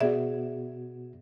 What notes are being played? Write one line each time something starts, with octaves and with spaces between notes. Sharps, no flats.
B2 B3 F#4 G#4 D5 E5